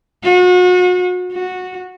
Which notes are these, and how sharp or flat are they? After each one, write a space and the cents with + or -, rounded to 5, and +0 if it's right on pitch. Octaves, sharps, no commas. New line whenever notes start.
F#4 -35
F#4 -10